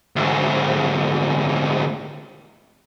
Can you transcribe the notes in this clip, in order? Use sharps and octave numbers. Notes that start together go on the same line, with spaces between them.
D2 G#2